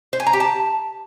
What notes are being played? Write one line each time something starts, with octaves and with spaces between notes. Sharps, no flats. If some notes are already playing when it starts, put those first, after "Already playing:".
C5
G#5
A#5
G4
A5